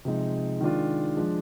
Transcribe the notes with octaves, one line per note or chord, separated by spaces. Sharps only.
C3 F3 G#3 D#4
D#3 G#3 D4 F4
F3 G#3 D4